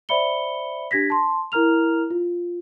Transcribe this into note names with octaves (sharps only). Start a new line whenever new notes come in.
C5 D5 E5 B5 C#7 G7
D4 G4 G#6 A#6 B6
A5 C6
E4 A#4 A#5 F6 F7
F4